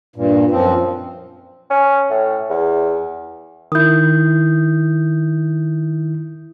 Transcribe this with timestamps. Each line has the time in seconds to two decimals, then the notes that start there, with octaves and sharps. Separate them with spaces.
0.16 G2 A#2
0.51 F#2 F3 C4
1.70 C#4
2.10 A2
2.50 E2
3.72 D#3 E4 D#6 G6